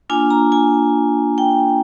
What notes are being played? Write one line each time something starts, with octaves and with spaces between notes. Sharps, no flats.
A#3 D4 F4 G#5
A#5
G#5
G5